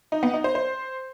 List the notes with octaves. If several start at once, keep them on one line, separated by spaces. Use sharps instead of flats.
D#4
B3
D#4
C5
C5